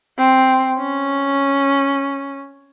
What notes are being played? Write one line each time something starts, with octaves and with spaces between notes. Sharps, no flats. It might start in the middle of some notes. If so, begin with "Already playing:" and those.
C4
C#4